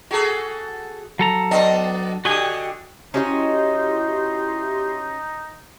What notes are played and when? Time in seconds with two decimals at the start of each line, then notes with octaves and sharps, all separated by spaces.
0.11 F#4 G#4 A4
1.19 F#3 A4 A#5
1.51 B3 D4 D#5
2.25 D3 F#4 G4 D#5 G#5
3.14 C#4 D#4 E4 F#4 G4 D#5 C6